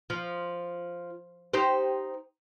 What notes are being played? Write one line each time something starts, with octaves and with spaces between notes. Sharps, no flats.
F3
D#4 G4 C5